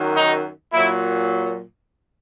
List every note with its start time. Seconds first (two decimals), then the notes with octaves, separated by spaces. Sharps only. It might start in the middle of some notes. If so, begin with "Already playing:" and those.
Already playing: F#2 D#3 F#3
0.16 D#4
0.73 A#2 F#3 E4